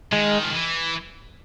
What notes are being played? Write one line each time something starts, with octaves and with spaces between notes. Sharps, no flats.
D#3 G#3
F3
E3